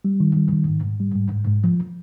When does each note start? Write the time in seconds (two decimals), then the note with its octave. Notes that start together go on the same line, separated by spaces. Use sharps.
0.05 G3
0.20 D#3
0.36 G3
0.52 D#3
0.68 G#2
0.84 G#2
1.00 G3
1.15 G#2
1.32 G#2
1.48 G#2
1.64 F3